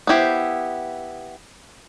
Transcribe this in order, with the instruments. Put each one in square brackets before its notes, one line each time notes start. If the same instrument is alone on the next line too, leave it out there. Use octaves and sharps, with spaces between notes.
[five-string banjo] B3 E4 G4 C5